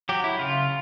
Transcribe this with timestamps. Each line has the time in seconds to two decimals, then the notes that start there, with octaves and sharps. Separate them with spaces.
0.09 F#3 G4
0.24 E4
0.39 C#3 F4